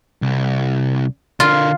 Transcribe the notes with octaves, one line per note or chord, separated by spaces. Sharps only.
C2
D3 F4 A#4